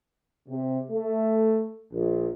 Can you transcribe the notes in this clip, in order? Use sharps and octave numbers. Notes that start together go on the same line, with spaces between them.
C3
A3
A#1